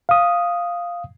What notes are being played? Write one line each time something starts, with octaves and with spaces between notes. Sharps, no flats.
F5 D#6